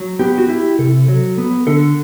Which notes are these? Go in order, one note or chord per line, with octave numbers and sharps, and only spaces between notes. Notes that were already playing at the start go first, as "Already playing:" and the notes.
Already playing: F#3
B3 G4
F#4
E4 G4
C3 A4
F#3
B3
D3 A4